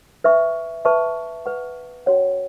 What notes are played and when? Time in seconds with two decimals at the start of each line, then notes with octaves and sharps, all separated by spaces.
0.24 B4 E5 G#5 C#6
0.85 B4 E5 A5 C#6
1.46 B4 F#5 C#6
2.06 C#4 F#4 C#5 F#5